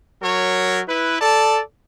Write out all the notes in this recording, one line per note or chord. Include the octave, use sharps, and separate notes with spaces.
F#3 A#4 C#5
E4 B4
A4 D5 A5